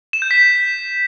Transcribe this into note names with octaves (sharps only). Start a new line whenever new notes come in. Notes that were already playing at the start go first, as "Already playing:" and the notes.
E7
G6
B6